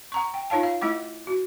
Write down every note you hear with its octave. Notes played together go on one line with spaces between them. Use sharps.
F#5 A#5 C#6
G5
D#4 F4 C#5 F5 A5
F5
A3 E4 F#5 D6
F#4